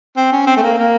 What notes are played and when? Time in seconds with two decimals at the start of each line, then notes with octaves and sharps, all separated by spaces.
0.16 C4
0.32 C#4
0.47 C4
0.57 A3
0.62 A#3
0.78 A#3